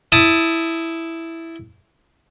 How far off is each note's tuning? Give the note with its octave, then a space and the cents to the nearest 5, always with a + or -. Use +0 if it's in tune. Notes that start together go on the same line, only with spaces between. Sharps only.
E4 +0 A5 +0 D#6 +0